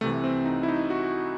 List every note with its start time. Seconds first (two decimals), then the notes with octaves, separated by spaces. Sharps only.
0.01 C2 A3
0.04 C3 E3
0.24 C4
0.46 D#4
0.63 E4
0.68 D#4
0.90 F#4